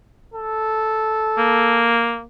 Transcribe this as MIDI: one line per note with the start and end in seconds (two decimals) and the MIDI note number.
0.34 2.06 69
1.38 2.24 58